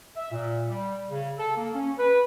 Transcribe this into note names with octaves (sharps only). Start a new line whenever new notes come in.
E5
A#2
G3
C#3
A4
A#3
C#4
B4